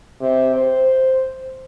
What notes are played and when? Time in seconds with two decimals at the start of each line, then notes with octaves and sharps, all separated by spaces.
0.21 C3
0.55 C5